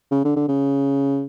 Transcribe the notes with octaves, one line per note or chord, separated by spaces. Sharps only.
C#3
D3
D3
C#3